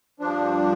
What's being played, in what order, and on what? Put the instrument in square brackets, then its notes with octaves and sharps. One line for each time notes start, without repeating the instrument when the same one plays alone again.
[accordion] G2 F3 D4